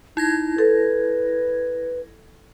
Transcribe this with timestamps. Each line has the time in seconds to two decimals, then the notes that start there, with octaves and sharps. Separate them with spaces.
0.17 D#4 E4 G#6 A#6
0.58 A4 B4